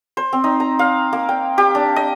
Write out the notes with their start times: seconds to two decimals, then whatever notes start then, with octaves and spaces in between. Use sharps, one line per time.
0.17 C5
0.33 C4
0.44 D#4
0.60 A#5
0.79 F5
1.13 A#3
1.29 G5
1.58 G4
1.75 D4
1.96 D#5